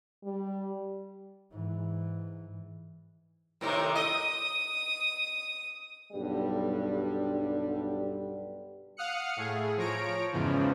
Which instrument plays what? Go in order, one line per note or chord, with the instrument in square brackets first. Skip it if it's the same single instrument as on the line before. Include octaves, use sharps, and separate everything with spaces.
[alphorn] G3
[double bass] G#2 E3
[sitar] A2 C3 D#3 [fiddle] A#4
[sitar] D#5 [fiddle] D#6
[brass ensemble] B1 G2 D3 G3
[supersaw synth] F5 F#5 D#6 F6 F#6 C#7
A2 A3 G#4
F3 C#5 A#5 D7
E2 G#2 C#3 E3 F3